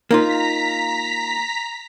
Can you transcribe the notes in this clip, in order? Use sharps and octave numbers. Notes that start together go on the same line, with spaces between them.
A#3 D#4 F4 A#5 B6